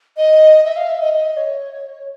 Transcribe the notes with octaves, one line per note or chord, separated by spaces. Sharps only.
D#5
E5
F5
E5
D#5
D#5
C#5